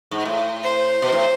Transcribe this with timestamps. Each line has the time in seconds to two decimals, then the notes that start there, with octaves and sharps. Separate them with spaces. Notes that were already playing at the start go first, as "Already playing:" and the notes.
0.11 G#2
0.25 A2
0.63 C5
1.02 B2
1.12 A2